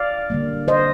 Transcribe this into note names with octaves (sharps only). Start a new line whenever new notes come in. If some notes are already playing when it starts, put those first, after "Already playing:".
Already playing: D5 F5
D3 G3 A#3
C5 D#5